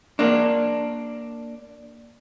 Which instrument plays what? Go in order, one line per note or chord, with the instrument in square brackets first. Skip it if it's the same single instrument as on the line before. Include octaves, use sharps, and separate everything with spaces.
[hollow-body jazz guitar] A#3 D4